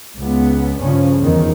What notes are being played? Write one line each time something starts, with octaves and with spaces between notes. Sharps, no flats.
C#2 B3
G2 C#3 F3 C#4
E2 D#3